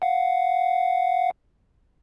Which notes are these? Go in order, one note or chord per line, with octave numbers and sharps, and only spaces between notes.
F5 F#5